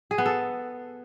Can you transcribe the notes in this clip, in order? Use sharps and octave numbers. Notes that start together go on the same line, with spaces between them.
G#4
B3
A4